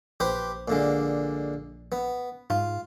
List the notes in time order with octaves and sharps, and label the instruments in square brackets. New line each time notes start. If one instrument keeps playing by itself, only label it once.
[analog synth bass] A#1 [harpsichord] G4 B4 C5
[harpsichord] A#2 D3 G#3
B3
[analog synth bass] G#2 [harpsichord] F4